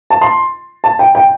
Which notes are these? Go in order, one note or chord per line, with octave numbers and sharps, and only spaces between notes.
A5
C6
A5
G5
G5